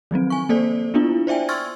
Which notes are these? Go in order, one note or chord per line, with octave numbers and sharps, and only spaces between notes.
D#3 F3 F#3 C4
G#5 C#6
A#3 A4 C5 D5
B3 D4 E4 F4
C5 D5 E5 G5 G#5
C6 C#6 E6 F6 G#6 A6